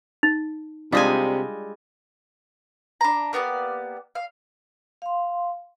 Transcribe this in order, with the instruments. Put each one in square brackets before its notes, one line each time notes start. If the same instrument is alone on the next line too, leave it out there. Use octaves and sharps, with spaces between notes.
[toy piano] D#4
[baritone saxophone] C3 [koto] G3 G#3 G#5 [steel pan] D4 F4 D#5
[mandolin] D4 A#5
A#3 B3 G4 D5
F5
[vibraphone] F5 C6